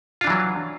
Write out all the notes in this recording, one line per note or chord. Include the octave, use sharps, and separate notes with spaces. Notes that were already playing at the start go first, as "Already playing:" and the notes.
E3 F#3 D4 F4